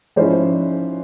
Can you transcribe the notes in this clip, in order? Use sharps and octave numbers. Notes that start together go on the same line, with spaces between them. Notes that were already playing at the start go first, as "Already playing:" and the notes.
G#2 F3 G#3 C#4 E4 C5 D5